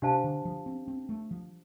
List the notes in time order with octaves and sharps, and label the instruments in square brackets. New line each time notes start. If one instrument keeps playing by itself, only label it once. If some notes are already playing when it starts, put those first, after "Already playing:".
[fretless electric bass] C3 [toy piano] D4 G4 C5 F5 A5
[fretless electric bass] D3
F3
C4
C4
A3
F3